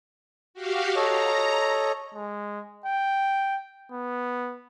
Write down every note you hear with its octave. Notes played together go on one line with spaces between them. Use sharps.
F#4 G4 F5
A4 C#5 D#5 A#5
G#3
G5
B3